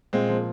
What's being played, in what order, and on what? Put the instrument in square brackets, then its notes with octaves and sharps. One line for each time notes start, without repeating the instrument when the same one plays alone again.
[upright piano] A#2 [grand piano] G#3 C4
[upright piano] F3 A#3